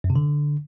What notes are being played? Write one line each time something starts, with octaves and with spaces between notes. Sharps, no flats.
F#2
C3
D3